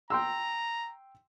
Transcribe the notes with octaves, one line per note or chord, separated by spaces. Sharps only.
G5 A#5 C6 E6